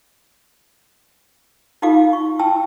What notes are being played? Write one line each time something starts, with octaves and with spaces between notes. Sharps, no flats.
D#4 F4 G4 A4 F5 D6
C#6
E4 G5 A5 E6